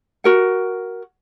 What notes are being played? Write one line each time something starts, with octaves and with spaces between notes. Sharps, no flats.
F#4 A#4 F#5